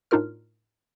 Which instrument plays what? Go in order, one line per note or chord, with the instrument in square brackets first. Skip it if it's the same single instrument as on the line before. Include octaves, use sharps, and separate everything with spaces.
[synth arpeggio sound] A2 D4 D#4 F4 A#4 F6